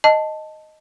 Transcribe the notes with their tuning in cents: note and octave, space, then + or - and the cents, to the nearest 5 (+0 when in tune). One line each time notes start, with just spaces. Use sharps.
D#5 +0 A5 +0